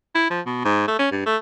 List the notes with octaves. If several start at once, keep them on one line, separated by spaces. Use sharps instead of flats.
E4
F3
B2
G#2
A3
C#4
G2
A3